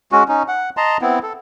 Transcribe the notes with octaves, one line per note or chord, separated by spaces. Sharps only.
G#3 C#4 F#4
C#4 D#4
F#5
D#5 A5 A#5 C6
B3 C4 E4
A4